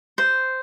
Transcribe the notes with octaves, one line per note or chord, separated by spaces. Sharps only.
C5